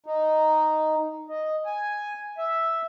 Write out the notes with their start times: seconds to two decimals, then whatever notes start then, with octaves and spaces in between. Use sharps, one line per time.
0.06 D#4
1.29 D#5
1.65 G#5
2.38 E5